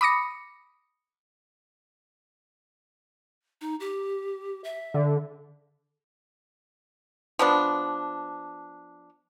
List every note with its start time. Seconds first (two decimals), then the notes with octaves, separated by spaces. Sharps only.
0.01 B5 D6 D#6 A#6 C#7
3.61 D#4
3.80 G4
4.64 E5
4.94 D3
7.39 F3 B3 D4